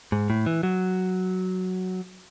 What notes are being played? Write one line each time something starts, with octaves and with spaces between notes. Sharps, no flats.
G#2
A2
E3
F#3